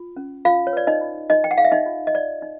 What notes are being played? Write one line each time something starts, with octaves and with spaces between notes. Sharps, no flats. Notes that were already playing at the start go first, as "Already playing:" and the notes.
Already playing: F4
C#4
F4 F5
C#5
B4 D5
D#4 D#5
F4
D#4 F4 D#5
G5
F#5
G#4 F5
E5
D#4 D#5
F4
D#5
D#4 D5
D#4